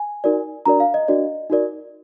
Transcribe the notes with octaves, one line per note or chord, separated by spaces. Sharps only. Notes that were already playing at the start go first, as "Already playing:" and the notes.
Already playing: G#5
D#4 F#4 A#4 D5
D4 F#4 A#4 D5 A#5
F5
D#5
D4 F#4 A#4 D5
D#4 F#4 A#4 D5